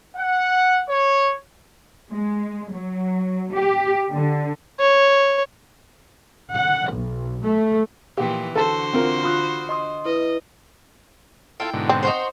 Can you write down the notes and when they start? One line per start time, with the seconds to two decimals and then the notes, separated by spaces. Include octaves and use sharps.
0.17 F#5
0.88 C#5
2.12 G#3
2.71 F#3
3.53 G4
4.13 D3
4.80 C#5
6.53 F#5
6.89 B1
7.42 A3
8.17 A#2 E3 F3 G4
8.55 D3 F#4 A4 C5 A5
8.93 C4 F4 A#4
9.23 F4 B5 D#6 F#6
9.69 D#5 C6 D#6
10.05 E4 B4 D#5
11.60 E4 F4 A4 G5
11.73 G#2 B2 D3
11.89 C4
12.03 D#4 F#4 C5